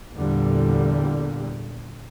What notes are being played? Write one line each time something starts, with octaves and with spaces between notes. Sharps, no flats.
E2 A#2 D3 G3